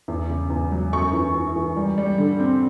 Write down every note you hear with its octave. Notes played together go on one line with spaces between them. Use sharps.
E2
C#3
E2
F#3
F#2 C#6
E3
E3
E3
G3
G3
D3
C4